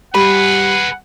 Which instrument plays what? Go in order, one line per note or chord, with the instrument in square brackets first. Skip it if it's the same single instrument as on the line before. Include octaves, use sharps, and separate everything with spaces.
[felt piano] G3 [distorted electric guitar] G#4 B4 [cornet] F#5 [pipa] B5